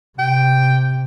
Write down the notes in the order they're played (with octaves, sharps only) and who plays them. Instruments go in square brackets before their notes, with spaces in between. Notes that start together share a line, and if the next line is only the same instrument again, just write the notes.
[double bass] C3 [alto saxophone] G5